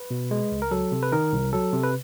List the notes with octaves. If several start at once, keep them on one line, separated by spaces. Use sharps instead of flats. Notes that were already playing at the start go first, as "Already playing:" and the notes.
Already playing: B4
B2
G#3
C#2
A#4
F#3 A4
C3
B4
D#3 A#4
C2
F#3 A4
C3
B4